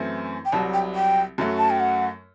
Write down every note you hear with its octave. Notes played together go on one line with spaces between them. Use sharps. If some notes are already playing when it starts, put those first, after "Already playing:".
Already playing: F#2 E3 A3 C4 E4
G5
C2 C3 F#3 A5
G5
G5
F#2 F#3 A3
A5
G5
F#5